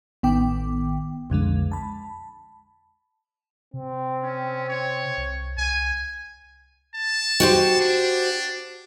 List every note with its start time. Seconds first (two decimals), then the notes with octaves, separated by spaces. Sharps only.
0.23 A1 D#3 B3 G5 D6
1.30 B1 F2 D3 G#3
1.72 A5 B5
3.74 C3 C4
4.23 C#4
4.68 C#5
5.17 C2
5.58 C2 G#5
6.95 A5
7.40 F#4 G4 C5
7.81 D4